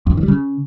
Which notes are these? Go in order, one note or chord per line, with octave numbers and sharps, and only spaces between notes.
F2
C3
D#3
G3
C#3